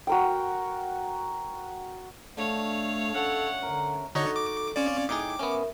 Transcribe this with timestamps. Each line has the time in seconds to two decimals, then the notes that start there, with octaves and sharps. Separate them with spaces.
0.07 F#4 A#4 G5
2.37 D3 A3 C#5 F5
3.14 C#4 A4 E5 F#5
3.63 D3 A#4 E5
4.15 D3 D#4 F#4 A4 C#5 D#5
4.36 D6
4.76 C4 C#4 D5 F5
5.09 A2 D#4 G#4 G5 D6
5.39 B3 C#4 A#4 E5